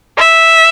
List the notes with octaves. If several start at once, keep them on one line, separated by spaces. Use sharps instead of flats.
E5